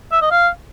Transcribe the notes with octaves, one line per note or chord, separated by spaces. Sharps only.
E5
D#5
F5